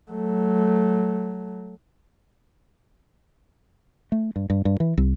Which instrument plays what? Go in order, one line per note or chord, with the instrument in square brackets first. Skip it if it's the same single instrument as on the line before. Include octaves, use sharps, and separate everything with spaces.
[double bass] F#3 A3
[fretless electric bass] A3
G2
G2
G2
E3
C2